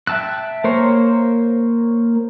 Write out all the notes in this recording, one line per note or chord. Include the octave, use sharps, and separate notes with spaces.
E5 G5 A5 E6 F#6
A#3 A#4 C5 C#5 C6